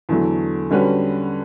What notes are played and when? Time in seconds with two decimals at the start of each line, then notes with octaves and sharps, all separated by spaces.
0.09 E2 D3 F#3 A3
0.71 D3 G3 C#4 F#4 B4